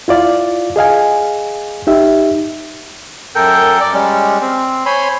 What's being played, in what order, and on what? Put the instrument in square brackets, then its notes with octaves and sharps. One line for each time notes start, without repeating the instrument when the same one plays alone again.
[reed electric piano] E4 F4 D5 F5
G#4 D#5 F5 G#5
D#4 G4 E5
[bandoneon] F#2 A4 A#4 G5 G6
D5
G3 G#3 C#4
C4
C5 C#5 G#5 B5 C6